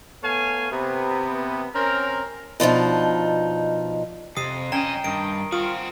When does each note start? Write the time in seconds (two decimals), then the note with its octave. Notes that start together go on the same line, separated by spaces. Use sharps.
0.22 A3 B3 C#5 F5 G#5
0.71 C3 B3
1.74 C4 C#4 A#4
2.60 B2 F3 D4 D#4
4.37 F2 C3 D#6 C7 D#7
4.72 F2 C#4 D#5 G5 A#5
5.04 G2 D#3 D7
5.52 C4 F4 F#4 D#6